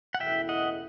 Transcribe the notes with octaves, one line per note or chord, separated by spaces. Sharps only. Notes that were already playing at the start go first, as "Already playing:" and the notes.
F#5
F#1 E2 B2 A3 E4 E5 G5
D#5 F#5